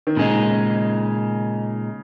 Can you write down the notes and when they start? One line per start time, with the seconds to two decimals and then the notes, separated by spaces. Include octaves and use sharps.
0.07 D#3
0.17 A#2 C#3 G#3 D#4